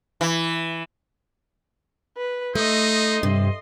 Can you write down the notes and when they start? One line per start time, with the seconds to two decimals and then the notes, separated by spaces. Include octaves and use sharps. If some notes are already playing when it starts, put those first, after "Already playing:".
0.21 E3
2.17 B4
2.55 A3 D#4 D#5 C6
3.23 G2 C3